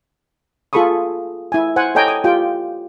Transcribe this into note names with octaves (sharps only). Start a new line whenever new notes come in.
F4 G#4 A4 B5 C#6 D#6
E4 G#5
C5 F#5 G#5
A4 C#5 D#5 G5 G#5 A#5
D#6
F4 G4 G5